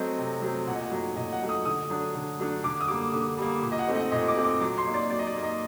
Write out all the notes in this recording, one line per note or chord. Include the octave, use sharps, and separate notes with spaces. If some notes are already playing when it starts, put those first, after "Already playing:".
Already playing: F#3 A3 C4 D#5
C3
F#3 A3 C4
A#2 F#5
D#5
F#5
F#3 A3 D#4
A#2 D#5
F#5
F#3 A3 D#4
D#6
D3 D#6
F#3 A3 D4
D3
F#3 A3 D4
D3 D6
D#6
G3 A#3 D6
D3
G3 A#3
A#2
D#5
F#5
A3 C4 D#4
D#5
A#2 D#5
D6
A3 C4 D#4
D6
F#3 D6
C6
A#3 D#4
D5
F#3 D5
D#5
D5
A#3 D#4
D#5